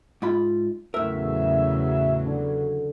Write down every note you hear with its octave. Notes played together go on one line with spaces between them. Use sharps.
G#2 F4 B5
E2 A2 C#3 F#3 A#4 E5
D3